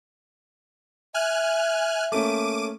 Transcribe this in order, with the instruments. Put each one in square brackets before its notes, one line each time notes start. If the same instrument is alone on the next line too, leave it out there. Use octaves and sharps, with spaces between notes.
[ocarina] E5 [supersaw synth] G#5 F6 F#6
[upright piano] A3 A#3 C#4 [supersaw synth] D6 D#7